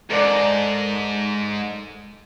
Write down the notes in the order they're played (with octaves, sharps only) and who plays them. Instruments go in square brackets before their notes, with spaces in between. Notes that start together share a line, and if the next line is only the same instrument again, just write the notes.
[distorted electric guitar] G#2 [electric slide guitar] A4 A#4 D5